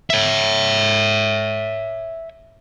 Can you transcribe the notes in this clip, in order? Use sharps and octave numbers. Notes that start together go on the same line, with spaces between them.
C#5 E5